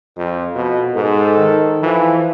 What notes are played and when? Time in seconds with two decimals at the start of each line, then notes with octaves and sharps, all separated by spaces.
0.17 F2 F4
0.55 B2
0.95 G#2 A4
1.37 D#3
1.83 E3 F3